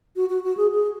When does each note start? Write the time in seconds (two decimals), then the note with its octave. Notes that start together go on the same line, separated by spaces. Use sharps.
0.16 F#4
0.29 F#4
0.44 F#4
0.57 G#4
0.71 G#4